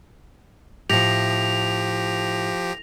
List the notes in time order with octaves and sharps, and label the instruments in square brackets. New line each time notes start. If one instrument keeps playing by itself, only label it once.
[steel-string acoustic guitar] A2 [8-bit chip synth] F3 G4 [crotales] A#6 F7